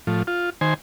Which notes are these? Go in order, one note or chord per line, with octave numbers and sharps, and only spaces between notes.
A2 F3
F4
D#3 C5 G#5